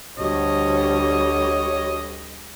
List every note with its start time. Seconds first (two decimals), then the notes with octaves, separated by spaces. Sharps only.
0.18 D2 G3 F#4 C#5 D#5